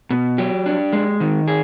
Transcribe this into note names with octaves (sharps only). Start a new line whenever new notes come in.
B2
F#3 G4
D4
G#3
D#3
G#4